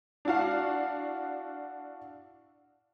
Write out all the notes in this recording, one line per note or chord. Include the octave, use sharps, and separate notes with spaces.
D4 E4 F#4 F5